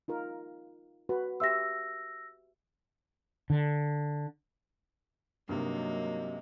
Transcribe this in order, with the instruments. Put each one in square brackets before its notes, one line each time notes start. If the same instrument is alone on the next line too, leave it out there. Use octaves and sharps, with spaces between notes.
[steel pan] D#4 F4 A#4
F#4 B4
[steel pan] G4 E5 C6 [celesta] E6 A#6
[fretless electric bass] D3
[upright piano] G2 C3 [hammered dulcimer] D#3 G#3 [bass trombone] F#3 [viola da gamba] A#3